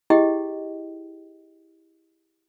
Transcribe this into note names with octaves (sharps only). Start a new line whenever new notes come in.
E4 G4 G#4 D#5 G5